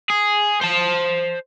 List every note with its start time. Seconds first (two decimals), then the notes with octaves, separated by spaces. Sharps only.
0.10 G#4
0.61 C5 A5